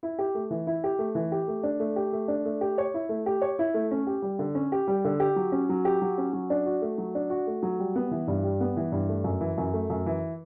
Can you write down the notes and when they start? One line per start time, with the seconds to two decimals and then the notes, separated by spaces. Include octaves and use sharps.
0.03 E4
0.19 G4
0.35 A3
0.50 E3
0.67 E4
0.84 G4
0.99 A3
1.15 E3
1.32 G4
1.48 A3
1.63 D4
1.80 A3
1.96 G4
2.13 A3
2.28 D4
2.45 A3
2.61 G4
2.78 C#5
2.94 E4
3.09 A3
3.26 G4
3.42 C#5
3.59 E4
3.74 A3
3.91 C#4
4.07 G4
4.22 G3
4.39 D3
4.55 C#4
4.72 G4
4.88 G3
5.05 D3
5.20 G4
5.36 F#3
5.52 C#4
5.69 F#3
5.85 G4
6.02 F#3
6.18 C#4
6.33 F#3
6.50 D4
6.66 F#4
6.82 A3
6.98 F#3
7.15 D4
7.30 F#4
7.47 A3
7.63 F#3
7.79 G3
7.96 B3
8.11 E3
8.28 G2
8.44 G3
8.61 B3
8.76 E3
8.92 G2
9.09 A3
9.24 F#2
9.41 E3
9.58 F#2
9.73 A3
9.90 F#2
10.06 E3